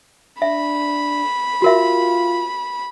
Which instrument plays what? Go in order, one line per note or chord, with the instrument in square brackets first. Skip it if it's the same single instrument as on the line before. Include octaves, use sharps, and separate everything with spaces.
[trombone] D4 [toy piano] E5 [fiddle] B5
[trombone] F4 [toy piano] F#4 A#4 E5